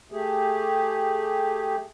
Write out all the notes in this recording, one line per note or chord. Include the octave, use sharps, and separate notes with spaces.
A3 G4 G#4